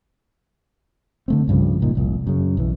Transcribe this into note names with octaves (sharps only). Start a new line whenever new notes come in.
D3 A3 C4
C2 G2 C#3 F3
G#1 C#2 A#2 D#3
F1 C2 A#2
F#2 C#3
B1 E3